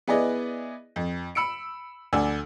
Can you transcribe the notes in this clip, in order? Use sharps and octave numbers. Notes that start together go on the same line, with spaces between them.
B3 E4 G#4 B4 D5 D#5
F2
B5 E6 C#7 D7
D2 D5 G#5 E6